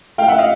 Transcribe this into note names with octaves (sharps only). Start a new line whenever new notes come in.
A3 F5 G5
E5 F#5
D#5 F5